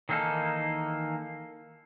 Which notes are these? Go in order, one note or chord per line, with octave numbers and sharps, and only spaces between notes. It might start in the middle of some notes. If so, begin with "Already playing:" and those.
D#3 E3 A#3 D#4 A4